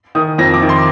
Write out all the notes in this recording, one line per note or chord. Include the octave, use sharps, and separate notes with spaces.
D#3 D#6
F2 A#6
D6
D#3
C6